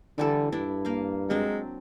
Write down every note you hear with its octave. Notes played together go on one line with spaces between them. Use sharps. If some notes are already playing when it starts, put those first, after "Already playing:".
D3 E3 G3 A4
G2 D4 E4
A#3 F5
F#3 G#3 C4 D4